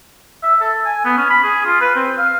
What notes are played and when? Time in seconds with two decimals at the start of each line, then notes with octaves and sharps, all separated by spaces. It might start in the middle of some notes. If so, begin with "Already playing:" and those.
0.43 E5
0.61 A4
0.85 G#5
1.04 B3
1.17 C#4
1.30 B5
1.44 G#4
1.66 F4
1.81 B4
1.96 C4
2.18 F5